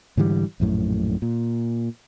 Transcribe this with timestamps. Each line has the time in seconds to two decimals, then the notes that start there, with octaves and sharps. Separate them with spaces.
0.17 G#2 D3 E3 G3
0.60 A#1 F#2 A2
1.22 A#2